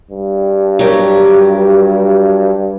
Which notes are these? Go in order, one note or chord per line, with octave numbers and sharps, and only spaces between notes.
G2
F#3 G4 A#4